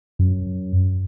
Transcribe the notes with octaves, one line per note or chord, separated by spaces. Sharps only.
F#2